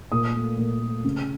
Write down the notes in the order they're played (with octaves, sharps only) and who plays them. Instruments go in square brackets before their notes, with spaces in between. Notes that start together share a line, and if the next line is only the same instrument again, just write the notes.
[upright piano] A#2 D#6
A3
A#2
A3
C#3